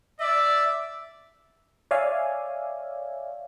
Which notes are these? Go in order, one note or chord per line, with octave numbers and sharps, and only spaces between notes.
D5 E5
C#5 D5 E5 F5 G#5